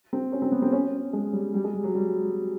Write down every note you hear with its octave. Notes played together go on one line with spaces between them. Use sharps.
C4
C#4
C4
B3
C4
C#4
G#3
G3
G3
G#3
G3
F#3
G3